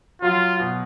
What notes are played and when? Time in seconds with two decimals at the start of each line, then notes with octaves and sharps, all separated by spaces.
0.22 F#3 F4
0.60 B2